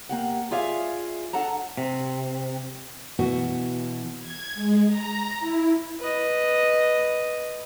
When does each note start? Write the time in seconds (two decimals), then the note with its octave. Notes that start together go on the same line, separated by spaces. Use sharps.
0.09 A#3 G4 F#5
0.51 F4 G#4 D5 E5 F5
1.33 D4 A4 F#5 A5 A#5
1.78 C3
3.19 B2 E3 B3 F#4
4.22 G#6
4.55 G#3
4.86 A#5
5.40 E4
6.00 B4 D#5